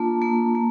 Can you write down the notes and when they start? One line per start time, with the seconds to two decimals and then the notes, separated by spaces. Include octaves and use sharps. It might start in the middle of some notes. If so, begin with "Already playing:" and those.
Already playing: A#3 D4 F4 A5
0.22 A#3
0.55 A#3